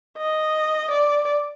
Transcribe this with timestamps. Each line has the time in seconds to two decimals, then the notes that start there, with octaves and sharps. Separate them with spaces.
0.18 D#5
0.91 D5